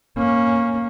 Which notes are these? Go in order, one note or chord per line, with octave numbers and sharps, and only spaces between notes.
A#3 C#4